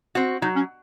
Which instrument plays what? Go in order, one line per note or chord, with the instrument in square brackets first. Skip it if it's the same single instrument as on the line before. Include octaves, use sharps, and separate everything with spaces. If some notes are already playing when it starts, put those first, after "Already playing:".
[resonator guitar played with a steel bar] C4 F#4
[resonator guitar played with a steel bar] F#3 [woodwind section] D#4
[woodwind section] C#4